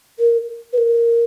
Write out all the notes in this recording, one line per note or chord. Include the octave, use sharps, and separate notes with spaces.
A#4
B4
A#4